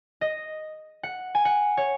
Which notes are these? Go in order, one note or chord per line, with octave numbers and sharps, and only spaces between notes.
D#5
F#5
G#5
F#5
C#5